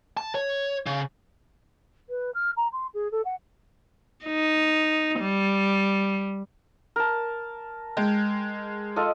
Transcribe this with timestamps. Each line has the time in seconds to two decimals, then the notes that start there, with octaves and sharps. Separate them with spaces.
0.17 A5
0.35 C#5
0.86 C#3
2.09 B4
2.34 F6
2.57 A#5
2.73 C6
2.94 G#4
3.11 A4
3.25 F#5
4.26 D#4
5.20 G3
6.96 A#4 A5
7.97 G#3 G5
8.96 F4 A4 D#5